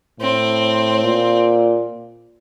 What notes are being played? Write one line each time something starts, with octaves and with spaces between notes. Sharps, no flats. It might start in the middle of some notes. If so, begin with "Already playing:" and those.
A2 C4
A#2